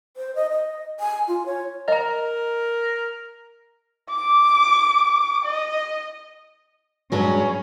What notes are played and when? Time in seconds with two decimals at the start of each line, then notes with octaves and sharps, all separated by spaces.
0.17 C5
0.35 D#5
0.51 D#5
1.00 G#5
1.28 F4
1.46 C#5
1.88 A#4 D#5 A#5
4.10 D6
5.45 D#5
7.12 G2 F#3 G#3 C#4